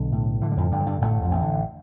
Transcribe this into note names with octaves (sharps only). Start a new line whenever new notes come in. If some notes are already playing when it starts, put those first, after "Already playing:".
Already playing: B1 D3
A2
D3 E3
G3
F2 F3
G2 D3 G3
F3
G2 G3
A1 A2 A3
F2 F3
A1
D3